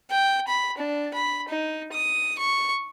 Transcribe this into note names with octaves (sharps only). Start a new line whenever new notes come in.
G5
B5
D4
B5
D#4
D#6
C#6